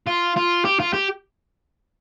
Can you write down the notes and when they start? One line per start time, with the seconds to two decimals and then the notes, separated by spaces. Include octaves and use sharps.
0.07 F4
0.36 F4
0.65 G4
0.80 F4
0.93 G4